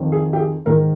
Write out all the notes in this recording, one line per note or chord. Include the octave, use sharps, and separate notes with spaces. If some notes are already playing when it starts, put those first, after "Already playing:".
Already playing: F2 D#3
G#4
G4
G#4
G#2 D#3 A#4